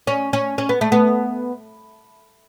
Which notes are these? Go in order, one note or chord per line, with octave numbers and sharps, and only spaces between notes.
C#4
C#4
C#4
B3
A3
B3